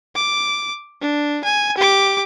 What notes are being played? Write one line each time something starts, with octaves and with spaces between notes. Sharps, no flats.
D6
D4
G#5
G4 D6